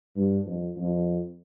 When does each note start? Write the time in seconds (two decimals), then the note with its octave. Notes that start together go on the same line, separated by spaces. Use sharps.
0.16 G2
0.46 F2
0.76 F2